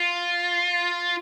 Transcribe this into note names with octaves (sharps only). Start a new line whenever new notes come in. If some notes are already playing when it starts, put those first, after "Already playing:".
Already playing: F4